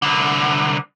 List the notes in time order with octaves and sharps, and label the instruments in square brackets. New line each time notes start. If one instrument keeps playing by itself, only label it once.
[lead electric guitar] C2 D3